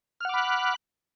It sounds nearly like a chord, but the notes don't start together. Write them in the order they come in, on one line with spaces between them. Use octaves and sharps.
F6 F#5 D6 B5 F#6